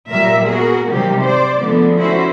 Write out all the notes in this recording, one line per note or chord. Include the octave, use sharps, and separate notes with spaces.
A#2 F#3 G3 A#3 A#4 E5
B3 F#4 G#4 A#4
C3 D#3 F#3 G3 A#3 G4
C5 D5
D3 F3 G#3 A3 B3
C#4 E4 F#4 C5